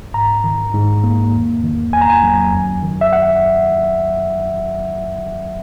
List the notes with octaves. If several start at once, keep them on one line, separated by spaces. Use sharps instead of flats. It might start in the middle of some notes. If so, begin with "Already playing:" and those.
G#2 A#5
D#3
G#2
A#3
E2
D#3
E2 G#5
A#5
G#5
F#3
F#2
D#3
E5
F#5